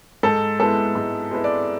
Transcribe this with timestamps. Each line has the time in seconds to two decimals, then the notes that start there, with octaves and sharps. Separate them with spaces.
0.23 G#2 A4
0.60 G#3 B3 E4 A4
0.95 G#2
1.31 G#3 B3 E4
1.44 D5